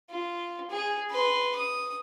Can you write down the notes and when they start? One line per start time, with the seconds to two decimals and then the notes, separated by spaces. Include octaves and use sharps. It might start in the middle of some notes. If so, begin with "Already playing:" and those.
0.10 F4
0.71 G#4
1.10 B4 C6
1.55 D#6